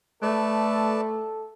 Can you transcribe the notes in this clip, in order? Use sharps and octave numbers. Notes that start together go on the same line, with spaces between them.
A3 A4 B4 D5 A5